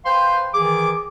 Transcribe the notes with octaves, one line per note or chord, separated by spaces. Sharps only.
B4 C5 F5 G5 C6
D#3 E3 G#4 D6